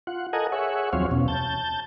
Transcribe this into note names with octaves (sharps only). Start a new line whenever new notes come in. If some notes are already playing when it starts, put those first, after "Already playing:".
F4 F#5
A4 A#4 D#5 F#5 G#5
G#4 C#5 E5 F#5
D#2 F3 F#3 C4 C#5 F5
E2 B2 C#4
A5 G6